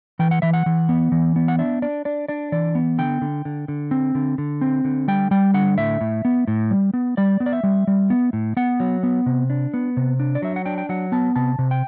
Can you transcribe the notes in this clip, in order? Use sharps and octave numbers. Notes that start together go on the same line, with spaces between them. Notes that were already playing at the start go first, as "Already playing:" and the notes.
E3 G5
F#5
E3 E5
F#5
E3
B3
E3
B3
F#5
D4 E5
D4 D5
D4 D5
D4 D5
E3 D5
B3
D3 G5
D3
D3
D3
C4
D3
D3
C4
D3
G3 G5
G3 G5
D3 F#5
A2 E5
A2
B3
A2
G3
B3
G3 D5
B3
D5
E5
G3
G3
B3
A2
B3 F#5
F#3
B3
C3
D4
B3
C3
D4
D5
F#3 E5
F#5
D4 G5
G5
F#3 F#5
B3 A5
C3 A5
C3
G5